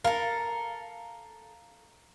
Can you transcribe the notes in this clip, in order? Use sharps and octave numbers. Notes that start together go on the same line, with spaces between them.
A4 A#4 F5